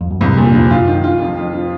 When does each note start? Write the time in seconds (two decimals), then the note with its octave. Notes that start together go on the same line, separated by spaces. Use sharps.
0.01 F2
0.11 F#2
0.21 C2 F2 G#2
0.37 F#2 A#2
0.54 F2 F3
0.70 F#2 F4
0.87 D#3
1.04 F4
1.20 F2
1.37 F2
1.53 F3